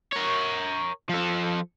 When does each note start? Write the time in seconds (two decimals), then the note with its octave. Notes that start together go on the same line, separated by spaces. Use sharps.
0.12 A#4 C#5
1.09 F3 A4